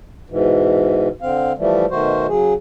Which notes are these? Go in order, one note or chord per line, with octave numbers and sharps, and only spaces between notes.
G#2 B2 E3
D3 C4 F5
E3 F3 G3 A3
B2 D#3 A3 F#4 C5
C#3 F#3 G#4